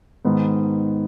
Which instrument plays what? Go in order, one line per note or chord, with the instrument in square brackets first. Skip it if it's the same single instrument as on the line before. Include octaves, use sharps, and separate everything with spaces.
[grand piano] G#2 D#3 B3